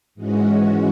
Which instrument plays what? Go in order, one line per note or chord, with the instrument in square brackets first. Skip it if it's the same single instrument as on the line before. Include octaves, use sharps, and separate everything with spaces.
[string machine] G#2 E3 G#3 C#4 F#4